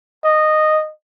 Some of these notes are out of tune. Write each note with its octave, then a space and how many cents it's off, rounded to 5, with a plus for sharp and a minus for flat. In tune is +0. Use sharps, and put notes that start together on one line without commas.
D#5 -10